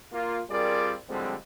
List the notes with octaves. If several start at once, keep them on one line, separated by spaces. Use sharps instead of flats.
A#3 F4
G3 C4 F4 G#4 A#4 D5
A2 D3 F3 G3 G#3 C4